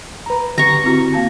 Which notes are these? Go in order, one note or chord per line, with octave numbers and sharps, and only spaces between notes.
B4 A#5
D3 G4 A#5 C#6
C4 E4 F#4
A#3 F5 A5